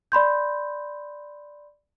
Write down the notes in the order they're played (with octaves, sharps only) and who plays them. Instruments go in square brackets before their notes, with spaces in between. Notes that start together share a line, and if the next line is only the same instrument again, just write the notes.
[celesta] D5 B5 C6 G6